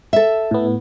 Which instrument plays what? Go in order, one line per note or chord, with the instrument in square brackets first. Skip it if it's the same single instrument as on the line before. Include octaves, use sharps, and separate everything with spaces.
[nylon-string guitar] A4 E5
[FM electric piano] A2 B3